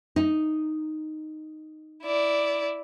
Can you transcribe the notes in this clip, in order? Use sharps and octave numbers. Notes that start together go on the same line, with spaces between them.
D#4
E4 D5